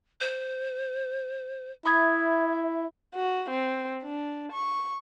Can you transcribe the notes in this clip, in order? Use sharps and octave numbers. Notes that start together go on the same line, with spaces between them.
C5
E4 E5 B5 D#6 G#6
F#4
C4
D4
C#6